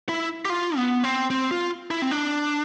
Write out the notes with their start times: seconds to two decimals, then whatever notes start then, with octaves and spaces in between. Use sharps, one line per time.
0.09 E4
0.45 G4
0.50 F4
0.77 B3
1.04 C4
1.30 C4
1.51 F4
1.91 E4
2.02 C4
2.11 D4